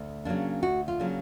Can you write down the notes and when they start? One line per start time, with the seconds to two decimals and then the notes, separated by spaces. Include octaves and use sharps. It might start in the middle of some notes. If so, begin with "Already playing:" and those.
Already playing: D2
0.25 C#3 F#3 A#3 D4
0.62 D2 F#4
0.88 F4
0.99 C#3 F#3 A#3 D4